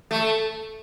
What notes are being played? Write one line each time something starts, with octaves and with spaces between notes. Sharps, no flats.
A3